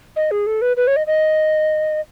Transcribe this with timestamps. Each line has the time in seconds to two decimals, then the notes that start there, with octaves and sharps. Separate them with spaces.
0.16 D#5
0.31 G#4
0.47 A4
0.62 B4
0.77 B4
0.87 C#5
0.96 D#5
1.07 D#5